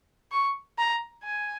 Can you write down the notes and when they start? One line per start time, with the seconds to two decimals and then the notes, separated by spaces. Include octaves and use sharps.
0.32 C#6
0.78 A#5
1.24 G#5